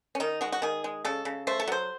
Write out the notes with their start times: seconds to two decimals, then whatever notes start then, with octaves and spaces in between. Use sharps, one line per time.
0.15 C#4
0.20 D#3 D#4
0.41 G#3 F#4
0.52 F#4
0.62 D#3 G#4
0.84 G#3
1.05 C#3 A4
1.25 C#3
1.47 A3 C5
1.60 A4
1.68 F#3 C5